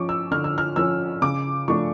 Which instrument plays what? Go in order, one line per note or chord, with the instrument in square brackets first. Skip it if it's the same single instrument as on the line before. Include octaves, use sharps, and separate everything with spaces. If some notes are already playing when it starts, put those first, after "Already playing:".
Already playing: [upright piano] F3 C#4 C#6 D6
E6
D3 F6
E6
F6
F3 C#4 E6
C#3 D6
F3 A3 D4 C#6